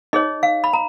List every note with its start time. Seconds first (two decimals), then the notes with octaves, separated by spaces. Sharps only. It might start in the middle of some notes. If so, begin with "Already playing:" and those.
0.13 D#4 G#4 C#5 D#5
0.43 F5
0.64 B5
0.73 A#5